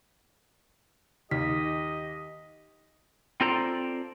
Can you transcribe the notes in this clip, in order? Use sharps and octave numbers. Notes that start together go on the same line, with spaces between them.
D#2 G4 D#5 B6
C4 F4 A4 C5 D5 A#5